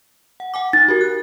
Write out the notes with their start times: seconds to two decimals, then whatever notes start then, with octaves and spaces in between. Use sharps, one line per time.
0.40 F#5
0.54 F#5 G#5 D6
0.73 D#4 A6
0.88 F#4 G4 A#4
1.01 F#6